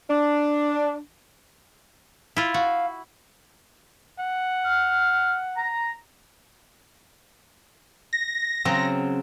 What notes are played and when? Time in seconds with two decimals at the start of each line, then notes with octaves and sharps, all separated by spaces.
0.10 D4
2.37 E4 F4
2.54 F#4 F5
4.19 F#5
4.65 F6
5.56 A#5
8.13 A#6
8.65 C#3 F#3 C4